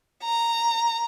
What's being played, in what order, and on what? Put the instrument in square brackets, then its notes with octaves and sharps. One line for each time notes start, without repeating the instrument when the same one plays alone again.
[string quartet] A#5